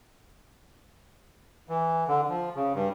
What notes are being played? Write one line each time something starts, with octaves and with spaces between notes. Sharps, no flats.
E3
D3
F3
C#3
G2